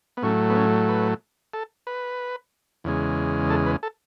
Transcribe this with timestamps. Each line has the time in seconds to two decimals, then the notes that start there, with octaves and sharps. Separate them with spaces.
0.17 B3
0.22 A2 F#3 A3 C#4
0.50 B3
0.56 C#4
0.88 B4
1.54 A4
1.87 B4
2.84 E2 C#3 G#3
3.50 A4
3.66 B4
3.83 A4